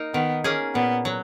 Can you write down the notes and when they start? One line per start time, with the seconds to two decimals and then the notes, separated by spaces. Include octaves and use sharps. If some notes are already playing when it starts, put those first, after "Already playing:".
Already playing: A#3 D#4
0.14 D#3 B3
0.44 A#3 C#4 G#4
0.75 A#2 B3
1.05 F#3